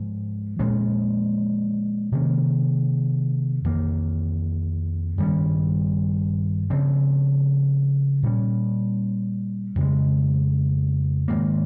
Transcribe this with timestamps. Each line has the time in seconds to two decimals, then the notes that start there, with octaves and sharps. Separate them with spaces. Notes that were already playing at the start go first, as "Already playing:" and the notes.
Already playing: G#2 F3 G#3
0.59 A#2 F3 G#3 C#4
2.12 C3 D#3 A#3 C#4
3.64 F2 D#3 A#3
5.18 G2 D#3 G3 C#4
6.70 C#3 F3 C4
8.23 A#2 G3 C#4
9.76 F2 C#3 G#3
11.28 G#2 D#3 A#3